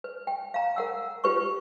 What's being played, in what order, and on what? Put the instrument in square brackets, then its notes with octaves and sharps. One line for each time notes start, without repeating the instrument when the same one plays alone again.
[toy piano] B4
G5
F5 A#5
A#4 F#5 E6
F4 G4 B4 C#6